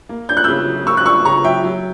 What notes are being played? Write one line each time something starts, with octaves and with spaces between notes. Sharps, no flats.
A#3
D4 G6
F#6
C#3 E6 G6
F#3
A#3 C#6 E6
F#6
D4 C#6 E6
C#3 A#5 C#6
F#3 E5 G5
F#3